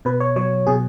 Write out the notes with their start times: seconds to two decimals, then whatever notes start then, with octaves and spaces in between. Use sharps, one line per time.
0.05 B2 B4
0.20 C#5
0.36 F#3 C#5
0.67 B2 G#4